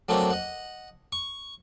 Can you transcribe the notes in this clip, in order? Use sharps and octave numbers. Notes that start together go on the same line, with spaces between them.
F#3 A3 A#3 C4 D4
D#5 F#5
C#6